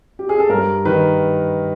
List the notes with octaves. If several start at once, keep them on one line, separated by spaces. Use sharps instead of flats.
G4
G#4
A4
G2 A#4
D#3 B4